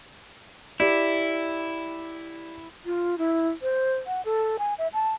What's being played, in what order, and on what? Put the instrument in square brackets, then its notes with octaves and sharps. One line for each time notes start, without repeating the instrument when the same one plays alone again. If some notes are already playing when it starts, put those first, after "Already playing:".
[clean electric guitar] E4 [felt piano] G4 D5
[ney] F4
E4
C5
F#5
A4
G#5
E5
A5